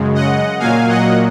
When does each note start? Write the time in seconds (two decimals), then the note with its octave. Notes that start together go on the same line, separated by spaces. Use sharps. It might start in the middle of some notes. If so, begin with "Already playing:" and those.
Already playing: F#2 C#3 G#3
0.14 D#5 F#5
0.59 A#2 F#3 A#3 F5 G#5
0.89 D#5 F#5